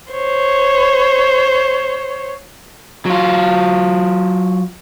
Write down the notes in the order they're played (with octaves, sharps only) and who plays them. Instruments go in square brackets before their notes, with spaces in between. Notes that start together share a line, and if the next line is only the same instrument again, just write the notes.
[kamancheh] C5 C#5
[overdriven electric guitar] F#3 F4